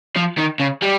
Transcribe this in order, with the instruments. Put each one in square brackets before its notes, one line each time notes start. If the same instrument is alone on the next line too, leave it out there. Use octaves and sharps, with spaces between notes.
[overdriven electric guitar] F3
D#3
C#3
G3